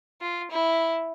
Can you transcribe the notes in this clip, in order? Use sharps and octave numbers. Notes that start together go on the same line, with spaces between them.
F4
E4